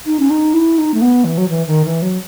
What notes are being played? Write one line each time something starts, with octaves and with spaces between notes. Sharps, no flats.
D#4
C#4
D#4
E4
D#4
A3
B3
E3
F#3
E3
D#3
E3
F#3